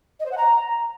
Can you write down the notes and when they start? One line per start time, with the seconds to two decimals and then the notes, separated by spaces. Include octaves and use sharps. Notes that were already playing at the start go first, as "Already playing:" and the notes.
0.19 D#5
0.25 C5
0.31 F#5
0.37 A#5